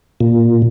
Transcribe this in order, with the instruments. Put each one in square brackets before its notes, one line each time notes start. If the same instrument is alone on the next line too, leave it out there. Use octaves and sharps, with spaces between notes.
[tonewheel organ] A#2